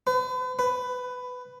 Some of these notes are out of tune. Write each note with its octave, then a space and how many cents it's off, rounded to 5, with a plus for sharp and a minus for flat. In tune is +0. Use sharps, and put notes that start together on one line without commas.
B4 +40
B4 +15